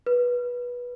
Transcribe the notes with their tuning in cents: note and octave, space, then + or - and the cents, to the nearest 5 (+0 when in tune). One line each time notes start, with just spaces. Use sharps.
B4 -20